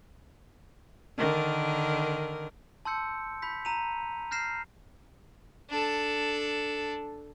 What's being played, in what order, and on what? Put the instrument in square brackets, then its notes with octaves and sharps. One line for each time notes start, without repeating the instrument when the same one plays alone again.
[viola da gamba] D3 D#3 A#4
[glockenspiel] A5 C6 E6 G6 C#7
B5 G6 B6
A#5 D#7 F7
F6 G6 A#6 C7 E7
[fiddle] D4 A4